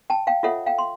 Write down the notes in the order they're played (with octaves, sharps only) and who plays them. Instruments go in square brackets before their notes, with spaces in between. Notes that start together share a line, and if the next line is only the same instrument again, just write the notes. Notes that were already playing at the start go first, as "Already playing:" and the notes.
[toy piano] G5 A5
F5 G5
F4 A4 C#5 E5 F#5
F5 G5
C6